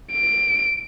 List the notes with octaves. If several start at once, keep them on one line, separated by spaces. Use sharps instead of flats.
D7